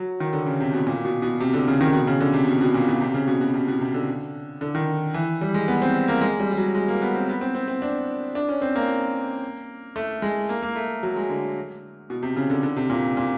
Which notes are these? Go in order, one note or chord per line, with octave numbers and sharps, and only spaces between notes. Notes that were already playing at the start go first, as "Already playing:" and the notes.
Already playing: F#3
D#3
D3
C#3
C3
B2
A#2
B2
B2
C3
D3
C#3
D#3
B2
C#3
D3
C3
B2
B2
A#2
B2
C3
C#3
B2
B2
C3
B2
C3
D3
D3
D#3
E3
G3
G#3
B3
C4
A#3
G#3
G3
G3
F#3
G#3
A#3
B3
C4
B3
C4
C4
C4
D4
D4
C#4
C4
A#3
A3
G#3
A#3
A#3
A3
F#3
G#3
D3
B2
C3
C#3
D3
D3
C3
A#2
A#2